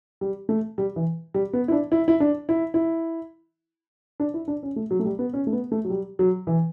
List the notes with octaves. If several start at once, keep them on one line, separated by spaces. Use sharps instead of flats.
G3
A3
G3
E3
G3
B3
E4
D4
E4
E4
D4
E4
E4
D4
E4
D4
C#4
A3
F#3
A3
G3
B3
C#4
A3
B3
A3
F#3
G3
F#3
E3